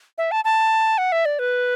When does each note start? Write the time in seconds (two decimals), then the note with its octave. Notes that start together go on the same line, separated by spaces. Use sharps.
0.18 E5
0.31 A5
0.45 A5
0.98 F#5
1.12 E5
1.25 D5
1.39 B4